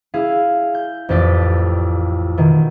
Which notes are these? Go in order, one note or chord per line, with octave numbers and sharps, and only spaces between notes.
E4 G#4 F5
G6
A1 F2 G4 D5 B6
B2 D#3